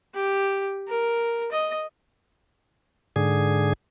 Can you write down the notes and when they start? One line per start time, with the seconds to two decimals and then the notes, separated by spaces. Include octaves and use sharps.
0.15 G4
0.88 A#4
1.52 D#5
3.16 G#2 D3 G#4